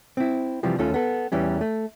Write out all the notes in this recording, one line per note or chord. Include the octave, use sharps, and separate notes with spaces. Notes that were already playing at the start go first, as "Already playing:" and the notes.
C4 E4
C3 E3 F3 G3
D#2 A3 C#4 F4 A4
B3 A4
E2 E3 G3 C#4
A3